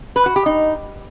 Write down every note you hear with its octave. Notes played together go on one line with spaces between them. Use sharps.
B4
F#4
G4
D#4